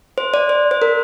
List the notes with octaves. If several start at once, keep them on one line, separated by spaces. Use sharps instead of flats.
C5
D5
C5
C5
A#4